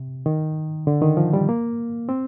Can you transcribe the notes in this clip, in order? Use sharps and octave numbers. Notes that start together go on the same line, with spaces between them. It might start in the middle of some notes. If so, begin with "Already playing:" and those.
Already playing: C3
D#3
D3
D#3
F3
G3
A#3
C4